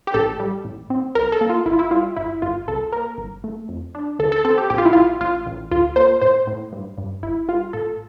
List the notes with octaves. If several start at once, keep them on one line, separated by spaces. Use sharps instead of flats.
G4
A1 A4
G3
A1
C4
C2 A#4
A4
A#3
F4
G1 E4
F4
E4
G3 F4
G1 E4
G1 F4
C2 A4
A#3 A#4
G1
A3
F2
D4
D2 A4
A4
C4 A4
G4
A#1 G4
F4
E4
A#1 F4
A1 F4
A1
D2 F4
A#3 C5
A2 C5
A2
G2
G2
G1 E4
G3 F4
A1 A4